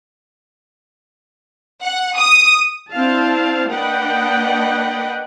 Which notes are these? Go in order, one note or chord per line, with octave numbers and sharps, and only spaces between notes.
F#5
D#6
C4 D4 E4 F5 A5
A#3 D4 B4 D#5 F#5 G5